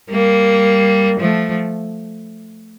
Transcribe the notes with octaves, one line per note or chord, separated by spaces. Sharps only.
G3 A#3
F3 A3